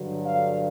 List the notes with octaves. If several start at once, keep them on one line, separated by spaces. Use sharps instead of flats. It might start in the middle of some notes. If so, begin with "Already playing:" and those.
Already playing: G2 D3 F#3
F5